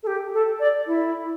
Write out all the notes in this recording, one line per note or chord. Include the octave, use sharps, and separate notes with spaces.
A4
G4
A4
D5
E4